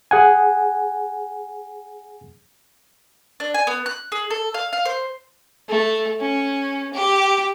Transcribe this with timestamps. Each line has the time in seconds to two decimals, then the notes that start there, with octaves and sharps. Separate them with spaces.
0.11 G#4 F#5 G#5
3.40 D4
3.54 G#5
3.67 B3
3.86 F#6
4.12 G#4
4.30 A4
4.54 F5
4.73 F5
4.85 C5
5.68 A3
6.20 C#4
6.93 G4